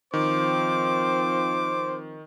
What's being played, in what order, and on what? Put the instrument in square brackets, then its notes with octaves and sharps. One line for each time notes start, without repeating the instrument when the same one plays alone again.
[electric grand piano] D#3 [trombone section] F3 C4 [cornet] C5 [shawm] D6